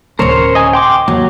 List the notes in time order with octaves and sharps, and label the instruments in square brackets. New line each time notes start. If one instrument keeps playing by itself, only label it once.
[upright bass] D1 C#4 [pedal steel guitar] A#4 C5 C#5
[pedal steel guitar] D#5 G#5
G5 C6 D6
[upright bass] D#2 [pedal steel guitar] F#3